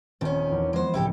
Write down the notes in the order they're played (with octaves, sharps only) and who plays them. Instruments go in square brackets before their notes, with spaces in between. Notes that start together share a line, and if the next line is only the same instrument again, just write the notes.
[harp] D#1 C4 [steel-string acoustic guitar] D#3 C#4
[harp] E2
[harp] F3 B3 [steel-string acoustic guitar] G#3 C5
[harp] C#2 A2 [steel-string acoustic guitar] E4 G4 A4